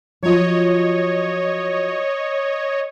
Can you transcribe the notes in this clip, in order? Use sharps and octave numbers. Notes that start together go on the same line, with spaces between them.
F3 F#3 F4 C#5 D#5